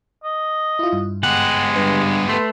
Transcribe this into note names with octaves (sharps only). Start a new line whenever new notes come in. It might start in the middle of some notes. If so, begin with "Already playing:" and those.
D#5
E4 F4
G2
G#3 B3 G4 F#5
G2 B4
A3 B4 C6